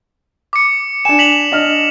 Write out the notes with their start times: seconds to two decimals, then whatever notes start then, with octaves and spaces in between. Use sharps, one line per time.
0.53 D6 C#7
1.05 D4 G#5 E7
1.19 B6 F7 F#7
1.52 D4 D#5 F6